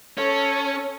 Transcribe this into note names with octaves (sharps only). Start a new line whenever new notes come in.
C#4 A4 C#5